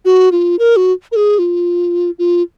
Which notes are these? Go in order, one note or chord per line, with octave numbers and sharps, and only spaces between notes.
F#4
F4
A#4
F#4
A#4
G#4
F4
F4